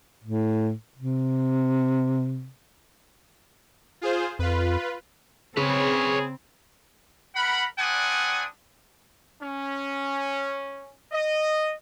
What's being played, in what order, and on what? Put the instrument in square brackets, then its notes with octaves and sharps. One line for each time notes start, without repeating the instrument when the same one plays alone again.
[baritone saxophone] A2
C3
[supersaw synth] F4 G#4 C5
[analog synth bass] F2 [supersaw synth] F4 B4
[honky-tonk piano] C#3 [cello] C4 [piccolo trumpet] G#4 [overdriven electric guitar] B4 C#5
[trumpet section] A#4 F#5 B5
G3 C4 D4 F#5 G#5 D#6
C#4
D#5